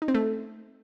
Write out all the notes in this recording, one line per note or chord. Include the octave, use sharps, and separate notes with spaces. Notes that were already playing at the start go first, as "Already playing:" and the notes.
D#4
C4
A3